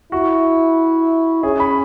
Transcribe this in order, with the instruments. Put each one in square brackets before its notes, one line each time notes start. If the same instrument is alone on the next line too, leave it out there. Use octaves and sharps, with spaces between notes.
[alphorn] E4 [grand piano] F#4
[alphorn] C#4 [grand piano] G#4
[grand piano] B5